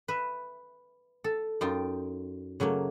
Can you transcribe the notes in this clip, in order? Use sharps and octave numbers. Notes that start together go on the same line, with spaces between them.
B4 E5
A4
F#2 D#4 F4 G5
C#3 F#3 A3 A#3